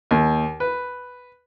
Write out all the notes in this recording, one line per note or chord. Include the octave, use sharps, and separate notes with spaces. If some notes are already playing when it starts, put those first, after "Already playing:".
D#2
B4